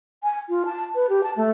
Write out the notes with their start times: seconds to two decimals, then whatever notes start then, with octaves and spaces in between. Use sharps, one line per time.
0.23 G#5
0.49 F4
0.66 A5
0.95 B4
1.09 G4
1.23 A5
1.37 A3